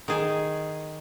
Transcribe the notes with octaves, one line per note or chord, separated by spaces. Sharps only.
D#3 G#4